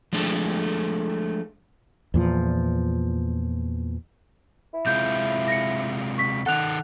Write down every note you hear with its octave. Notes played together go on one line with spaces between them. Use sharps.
F3 G#3 A3 D4 G#4 A4
E2 A#2 F3
E4
C3 G#3 F4 G6
A#6 C#7
C#6 B6
D#3 A4 F#5 F#6 F7